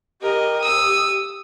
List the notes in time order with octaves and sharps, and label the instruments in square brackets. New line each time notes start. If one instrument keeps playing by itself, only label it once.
[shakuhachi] G4 [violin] A#4 D#5
[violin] D#6 E6